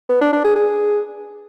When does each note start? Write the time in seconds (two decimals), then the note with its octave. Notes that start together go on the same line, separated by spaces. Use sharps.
0.09 B3
0.21 D4
0.33 D4
0.44 G#4
0.56 G#4